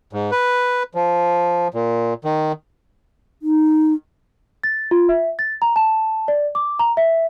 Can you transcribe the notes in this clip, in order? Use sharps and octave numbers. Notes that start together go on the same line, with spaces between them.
G#2
B4
F3
A#2
D#3
D#4
A6
F4
E5
A6
A#5
A5
D5
D6
A#5
E5